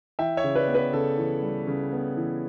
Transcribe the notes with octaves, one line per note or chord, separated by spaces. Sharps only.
E3 E5 G5
C#5 E5
C#3
B4 D5
B3
B4
C#3 A4
E3
G3
C#3
B3
E3